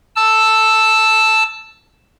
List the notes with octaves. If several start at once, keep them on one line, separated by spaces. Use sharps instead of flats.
A5 E6